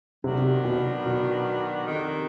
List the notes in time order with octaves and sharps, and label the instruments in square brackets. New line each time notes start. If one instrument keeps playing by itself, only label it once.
[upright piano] C3 [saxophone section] D#3 F#3 B3 D4 F#4
[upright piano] B2
B2
[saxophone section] F2 C3 D#3